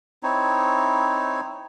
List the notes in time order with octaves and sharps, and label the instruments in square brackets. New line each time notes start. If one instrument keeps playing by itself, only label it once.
[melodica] C4 D#4 E4 C#5